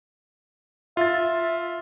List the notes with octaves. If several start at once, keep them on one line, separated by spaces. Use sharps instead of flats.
F4 E5 A6